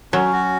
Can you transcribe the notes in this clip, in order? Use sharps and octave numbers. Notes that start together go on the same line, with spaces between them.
F#3 C#4
F#4